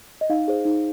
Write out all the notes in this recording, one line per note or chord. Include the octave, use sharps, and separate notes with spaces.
D#5
D#4 F5
G#4 C5
D#4